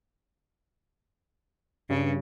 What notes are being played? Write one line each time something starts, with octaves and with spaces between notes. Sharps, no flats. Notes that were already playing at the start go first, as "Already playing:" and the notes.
G2 C#3